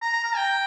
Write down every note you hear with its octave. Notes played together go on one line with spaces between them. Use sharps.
A#5
A#5
A#5
G5